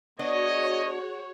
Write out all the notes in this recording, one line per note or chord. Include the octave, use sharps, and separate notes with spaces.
B3 D4 F#4 G#4 C#5 D#5